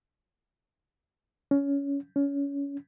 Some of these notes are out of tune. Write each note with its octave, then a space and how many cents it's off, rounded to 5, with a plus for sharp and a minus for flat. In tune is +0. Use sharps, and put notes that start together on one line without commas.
C#4 +20
C#4 +25